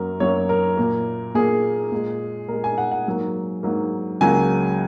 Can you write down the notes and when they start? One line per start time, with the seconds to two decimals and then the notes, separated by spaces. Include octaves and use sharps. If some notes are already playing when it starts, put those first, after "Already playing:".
Already playing: F#2 F#3 A#3 A#4
0.20 F#2 F#3 A#3 C#5
0.49 A#4
0.77 A#2 A#3
1.34 A#2 A#3 G#4
1.92 A#2 G#3
2.48 A#2 G#3 A#4
2.64 G#5
2.78 F#5
2.92 F#5
3.06 G#2 F#3 A#3
3.63 G#2 F#3 A#3
4.21 C#2 C#3 F#3 A#3 G#5